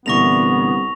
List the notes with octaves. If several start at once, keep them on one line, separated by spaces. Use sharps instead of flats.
C2 A#2 D3 E3 B3 C#6 A#6 F7